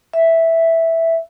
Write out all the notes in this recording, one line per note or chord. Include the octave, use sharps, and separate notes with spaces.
E5